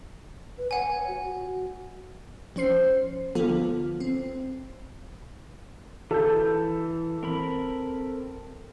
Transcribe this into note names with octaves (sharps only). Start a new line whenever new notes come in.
B4
C#5 F#5 G#5
F#4
F#4
F3 C#4 C5 C7
D3 F3 B3 F4 A4
C4
E3 A4 G6
C4 A#4 B5